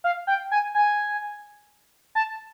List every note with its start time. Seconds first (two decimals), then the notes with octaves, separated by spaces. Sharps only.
0.04 F5
0.27 G5
0.51 G#5
0.75 G#5
2.15 A5